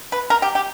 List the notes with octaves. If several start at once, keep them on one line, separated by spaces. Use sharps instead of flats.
B4
A#4
G4
G4